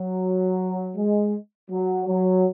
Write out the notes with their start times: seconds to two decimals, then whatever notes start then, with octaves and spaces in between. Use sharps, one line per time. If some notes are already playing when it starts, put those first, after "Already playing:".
Already playing: F#3
0.97 G#3
1.71 F#3
2.07 F#3